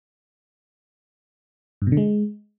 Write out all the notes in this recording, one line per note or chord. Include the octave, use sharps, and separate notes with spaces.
G2
B2
D3
G#3